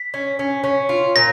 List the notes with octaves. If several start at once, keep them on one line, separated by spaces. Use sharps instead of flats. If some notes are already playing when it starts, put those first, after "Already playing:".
Already playing: B6
C#4
C#4
C#4
F4
A#2 A#6